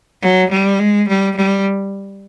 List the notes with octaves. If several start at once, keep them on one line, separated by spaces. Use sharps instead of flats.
F#3
G3
G#3
G3
G3